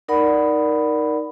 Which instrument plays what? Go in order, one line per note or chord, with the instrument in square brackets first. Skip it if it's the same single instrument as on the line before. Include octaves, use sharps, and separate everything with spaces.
[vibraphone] D#4 A#4 D5 F#5 B5